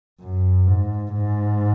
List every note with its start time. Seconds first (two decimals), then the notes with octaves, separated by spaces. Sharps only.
0.20 F#2
0.67 G#2
1.13 G#2